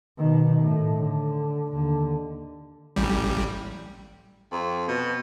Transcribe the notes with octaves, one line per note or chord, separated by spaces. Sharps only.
B2 D#3
A2
D3
D#2 D3
A1 G3
F2
B2